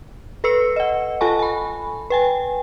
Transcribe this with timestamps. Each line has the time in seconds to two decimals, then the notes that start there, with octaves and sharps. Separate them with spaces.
0.44 A4 B4 E6 C#7
0.76 D#5 F#5
1.21 F4 A4 G#5 A5 C#6
1.39 G#5 B5
2.10 B4 G5 G#5